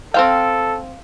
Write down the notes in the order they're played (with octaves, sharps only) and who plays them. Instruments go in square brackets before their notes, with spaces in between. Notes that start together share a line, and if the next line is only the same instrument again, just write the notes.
[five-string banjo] C4 C5 G5 [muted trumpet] A4 [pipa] F5